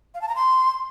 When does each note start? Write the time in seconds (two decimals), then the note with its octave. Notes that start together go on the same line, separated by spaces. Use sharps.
0.14 F5
0.21 A5
0.28 A#5
0.35 C6